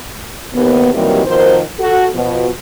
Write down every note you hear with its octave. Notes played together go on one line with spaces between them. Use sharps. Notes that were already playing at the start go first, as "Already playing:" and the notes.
D#2 B3
C3 D#3 E3 F#3 G3 A#3
B2 D#3 F3 A#4 C5
F#4 A4
B2 F3